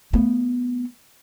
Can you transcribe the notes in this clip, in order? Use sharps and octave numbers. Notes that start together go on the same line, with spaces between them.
A3 B3